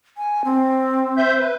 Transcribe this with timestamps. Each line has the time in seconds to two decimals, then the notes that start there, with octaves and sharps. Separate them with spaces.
0.17 G#5
0.45 C4
1.17 C5 E5 G6
1.39 B4